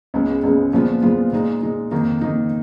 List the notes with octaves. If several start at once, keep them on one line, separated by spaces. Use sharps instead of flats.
C#2 C#3 G#3 B3
C#2 C#3 G#3 B3
A#2 F3 G#3 B3 F4
A#2 F3 G#3 B3 F4
A#2 G#3 D#4
A#2 G#3 D#4
F2 D#3 A#3 D#4
F2 D#3 A#3 D#4